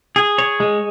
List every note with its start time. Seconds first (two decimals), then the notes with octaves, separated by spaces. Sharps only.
0.16 G#4
0.38 C#5
0.60 G#3